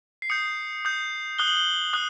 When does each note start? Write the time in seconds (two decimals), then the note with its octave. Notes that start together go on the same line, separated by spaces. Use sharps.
0.22 C7
0.30 D#6 G6 C#7
0.85 D#6 G6
1.38 D#6 F#6 G7
1.47 F#7
1.57 G7
1.93 D#6 F#6